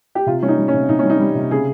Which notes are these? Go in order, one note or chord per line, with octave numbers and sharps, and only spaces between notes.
G4
C3 F4
G3 C#4
D#4
G3
C#4
C3
C3 D#4
C#4
G3
D#4
G3
C3
C#3 G#4